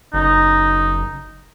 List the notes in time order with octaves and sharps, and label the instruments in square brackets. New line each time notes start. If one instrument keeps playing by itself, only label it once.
[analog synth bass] F#1 [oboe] D#4